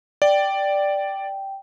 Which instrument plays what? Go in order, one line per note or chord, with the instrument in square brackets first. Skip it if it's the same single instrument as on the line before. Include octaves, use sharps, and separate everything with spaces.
[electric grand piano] D5 [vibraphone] G5